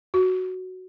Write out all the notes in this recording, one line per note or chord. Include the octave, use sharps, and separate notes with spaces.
F#4